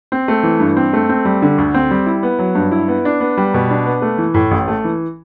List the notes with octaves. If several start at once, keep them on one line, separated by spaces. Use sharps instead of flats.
C4
A3
E3
G2
C4
A3
C4
G3
D3
D2
C4
G3
E4
B3
F#3
G2
E4
B3
D4
B3
G3
B2
D4
B3
A3
E3
A2
A1
A3
E3